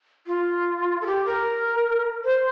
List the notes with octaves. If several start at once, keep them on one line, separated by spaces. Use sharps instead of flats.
F4
A4
G4
A#4
C5